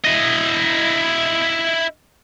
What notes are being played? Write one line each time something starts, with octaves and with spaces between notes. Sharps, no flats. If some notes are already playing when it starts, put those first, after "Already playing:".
E4 D#5